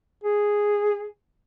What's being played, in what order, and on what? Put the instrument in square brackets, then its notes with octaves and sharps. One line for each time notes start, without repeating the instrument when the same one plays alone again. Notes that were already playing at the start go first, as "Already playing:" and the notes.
[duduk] G#4